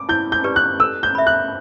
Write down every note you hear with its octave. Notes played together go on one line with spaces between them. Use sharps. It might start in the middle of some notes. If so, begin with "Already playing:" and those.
Already playing: D6
E4 G6
G6
G4 B4 D5
F#6
A4 E6
G6
E5 B5
F#6